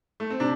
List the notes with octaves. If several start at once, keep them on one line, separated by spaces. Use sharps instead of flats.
A3
C4
C3 D4